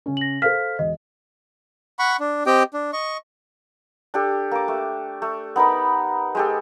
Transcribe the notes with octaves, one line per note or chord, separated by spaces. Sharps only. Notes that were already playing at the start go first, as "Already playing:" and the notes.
C#3 C#4
A#6 F#7
A4 C5 F5 F6 B6
E1 D#5
F#5 B5 C#6
D4
C4 G4 D#5 G5
D4
D#5 C#6
D4 G4 A4
A#3 D6
A3
A3
B3 D#4 A#4 B5
G#3 G4 A4